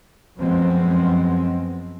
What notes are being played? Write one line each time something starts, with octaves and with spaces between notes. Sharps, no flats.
F#2 F3 G#3 B3 C4